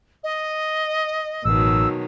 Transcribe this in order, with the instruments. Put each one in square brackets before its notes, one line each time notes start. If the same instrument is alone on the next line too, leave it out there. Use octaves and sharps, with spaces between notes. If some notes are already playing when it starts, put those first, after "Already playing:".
[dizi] D#5
[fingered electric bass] A1 [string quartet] B2 D#3 F#3 [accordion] E6